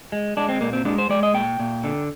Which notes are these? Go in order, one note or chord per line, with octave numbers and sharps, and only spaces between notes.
G#3
G#3 D4
C4
A#2 A#3
C4
G#3 D4
C5
G#3 D5
D#5
A#2 G5
A#2
D3